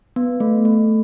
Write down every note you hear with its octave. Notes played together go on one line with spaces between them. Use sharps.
B3
A3
A3